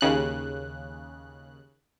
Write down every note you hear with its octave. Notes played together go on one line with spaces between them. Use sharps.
D#2 C#3 F#6